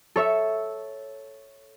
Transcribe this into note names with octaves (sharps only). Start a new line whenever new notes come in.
A4 C#5 E5